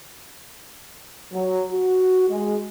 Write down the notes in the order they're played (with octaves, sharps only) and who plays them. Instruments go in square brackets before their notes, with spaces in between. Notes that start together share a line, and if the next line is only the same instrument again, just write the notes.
[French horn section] F#3
F#4
G#3